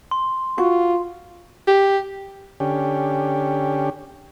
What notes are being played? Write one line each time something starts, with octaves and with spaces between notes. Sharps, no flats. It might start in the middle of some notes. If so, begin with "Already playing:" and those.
C6
F4 F#4
G4
D3 C#4 G4